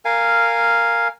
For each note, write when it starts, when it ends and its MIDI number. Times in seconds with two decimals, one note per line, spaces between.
0.05 1.08 70
0.05 1.08 77
0.05 1.08 80